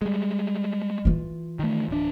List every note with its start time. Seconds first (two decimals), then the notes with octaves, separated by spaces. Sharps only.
0.02 G3 G#3
1.05 E3 F4
1.59 D#3 A3
1.88 D1 D4